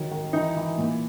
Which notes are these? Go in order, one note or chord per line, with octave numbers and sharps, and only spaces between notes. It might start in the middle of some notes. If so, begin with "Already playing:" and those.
Already playing: D#3 F#3
D#3
E3 D#4
E3
A#2